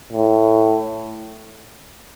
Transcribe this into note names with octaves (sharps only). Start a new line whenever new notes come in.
A2